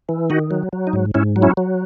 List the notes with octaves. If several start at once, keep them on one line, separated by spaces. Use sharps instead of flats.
E3
D#3 D#4 F#4
F#3
F#3
D#4
G#2
G#2 C#4 E4
F#3
C#4 E4
F#3